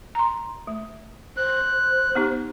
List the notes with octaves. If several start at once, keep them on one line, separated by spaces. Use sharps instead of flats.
A#5 C6
A3
C5 F#6
B3 D#4 G4